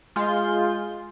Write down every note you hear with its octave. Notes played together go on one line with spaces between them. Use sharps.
G#3 F4 G6